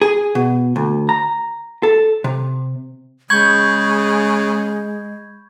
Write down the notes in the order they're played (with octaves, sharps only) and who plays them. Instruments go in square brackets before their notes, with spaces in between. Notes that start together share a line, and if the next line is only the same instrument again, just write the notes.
[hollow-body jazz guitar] G#4
B2
D2
A#5
A4
C3
[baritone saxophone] C#3 [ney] G#3 [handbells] B5 C#6 G6 [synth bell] G#6